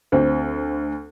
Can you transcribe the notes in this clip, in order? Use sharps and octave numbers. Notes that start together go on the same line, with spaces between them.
D2 C4